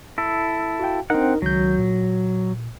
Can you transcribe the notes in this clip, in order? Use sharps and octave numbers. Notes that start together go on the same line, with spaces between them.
E4 A4
F#4 F5 G5
C4 D4 D#4 A#4 F#5
C#2 D#3 F#3 G6
A#2